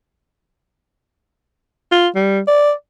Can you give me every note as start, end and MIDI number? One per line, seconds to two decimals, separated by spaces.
1.92 2.08 65
2.15 2.40 55
2.48 2.72 74